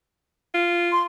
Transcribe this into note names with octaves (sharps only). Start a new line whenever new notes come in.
F4
C6